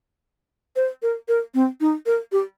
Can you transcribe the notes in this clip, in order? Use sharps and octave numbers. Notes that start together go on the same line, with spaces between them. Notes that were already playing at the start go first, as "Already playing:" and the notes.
C5
A#4
A#4
C4
D#4
A#4
G4